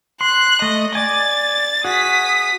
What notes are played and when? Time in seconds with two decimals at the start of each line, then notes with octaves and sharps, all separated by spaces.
0.21 C6 F#6
0.62 A3 D#5
0.95 D5 G#5 A6
1.84 F#4 G#4 D#6 B6